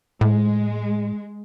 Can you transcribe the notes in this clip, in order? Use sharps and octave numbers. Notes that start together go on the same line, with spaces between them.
A2 G#3